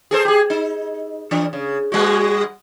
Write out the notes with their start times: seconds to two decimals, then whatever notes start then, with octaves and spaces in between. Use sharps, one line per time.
0.11 G#4 A4 C5
0.25 G4 G#4
0.50 D#4
1.31 E3 D4
1.53 C#3
1.92 G3 G#3 F#4